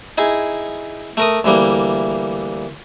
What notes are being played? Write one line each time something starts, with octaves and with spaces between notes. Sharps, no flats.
D#4 E4 G#4
A3 A#4 D#6
D2 E3 G3 A#3